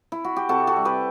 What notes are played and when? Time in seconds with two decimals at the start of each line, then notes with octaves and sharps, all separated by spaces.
0.12 E4
0.25 F#4
0.36 G4
0.49 C3 F#4 A4
0.67 F#4 A4
0.76 G3
0.85 G4 B4